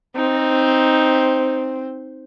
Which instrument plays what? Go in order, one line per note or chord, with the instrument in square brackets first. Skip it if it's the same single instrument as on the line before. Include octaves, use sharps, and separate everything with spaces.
[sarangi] C4 [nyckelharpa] D#4